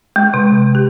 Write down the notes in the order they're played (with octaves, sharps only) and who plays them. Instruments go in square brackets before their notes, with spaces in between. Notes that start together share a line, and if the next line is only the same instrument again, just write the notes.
[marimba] G#3
C3
G4